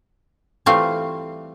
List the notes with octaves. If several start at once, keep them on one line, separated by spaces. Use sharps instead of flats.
E3 G3 A3 C4 F4